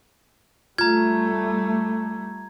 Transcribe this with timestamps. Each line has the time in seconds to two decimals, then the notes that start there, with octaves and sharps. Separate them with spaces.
0.78 G3 A3 F4 A#5 G#6